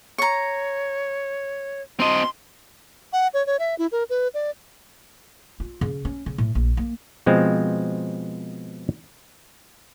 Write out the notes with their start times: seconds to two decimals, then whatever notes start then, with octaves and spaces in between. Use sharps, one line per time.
0.18 C#5 A#5 C#6
2.00 C4 D#5 C6
3.13 F#5
3.34 C#5
3.47 C#5
3.59 E5
3.78 E4
3.92 A#4
4.10 B4
4.34 D5
5.60 F4
5.81 C#3
6.05 C#4
6.26 C#3
6.38 A2
6.55 A#1
6.77 A#3
7.26 B2 F3 G#3 C4